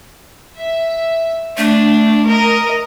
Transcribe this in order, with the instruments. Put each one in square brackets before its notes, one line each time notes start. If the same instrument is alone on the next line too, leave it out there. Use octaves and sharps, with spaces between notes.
[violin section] E5
[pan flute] A3 [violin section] D4
[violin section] A#4 D#5